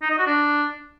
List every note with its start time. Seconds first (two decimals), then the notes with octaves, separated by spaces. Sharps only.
0.02 D#4
0.10 D#5
0.18 F#4
0.27 D4